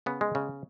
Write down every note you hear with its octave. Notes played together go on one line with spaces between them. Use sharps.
C#3 B3
G#3
C#3